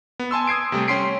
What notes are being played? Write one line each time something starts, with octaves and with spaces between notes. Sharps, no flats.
B3
G#5 A5 C6 E6
D#6 G#6 C7 D7
C3 G3 A3
C#4 G5 C6 B6 C7 D7